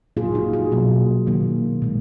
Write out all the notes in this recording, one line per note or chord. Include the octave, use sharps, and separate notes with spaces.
A#2 F#3 A#3 F4 G#4
D#4 F#4
F4 G#4
B2 F#3 A#3
D#3 F#3 A#3
A#2 G#3